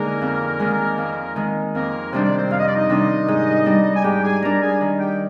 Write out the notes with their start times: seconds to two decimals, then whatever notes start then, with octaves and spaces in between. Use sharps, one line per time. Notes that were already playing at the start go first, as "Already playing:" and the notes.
Already playing: D3 G#3 A#3 D#4 G#4 A#4
0.22 F2
0.60 D#3 G#3
0.98 F2
1.36 D#3 G#3
1.74 F2 A#3 A#4
2.13 C3 D#3 G3 D4 C5
2.23 D5
2.34 C4 C5
2.51 F2 F5
2.59 D#5
2.67 D5
2.75 D#4 D#5
2.90 C3 D#3 G3 D4
3.28 G#2
3.66 G3 D4
3.96 G#5
4.04 G#2 G4 G5
4.23 G#4 G#5
4.42 G3 D4 A#4 A#5
4.62 G#4 G#5
4.81 D#3
5.00 G4 G5